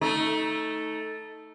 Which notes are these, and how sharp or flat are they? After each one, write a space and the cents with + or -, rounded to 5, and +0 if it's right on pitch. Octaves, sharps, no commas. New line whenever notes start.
A3 +0 D#4 +20